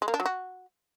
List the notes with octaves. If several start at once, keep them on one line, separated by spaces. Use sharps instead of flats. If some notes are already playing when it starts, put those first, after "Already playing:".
G#3
A#3
D4
F#3
F#4